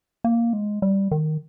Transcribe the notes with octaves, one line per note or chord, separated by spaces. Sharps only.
A#3
G#3
G3
D#3